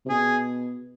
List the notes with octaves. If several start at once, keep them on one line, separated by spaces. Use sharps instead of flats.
C3
B2 G#4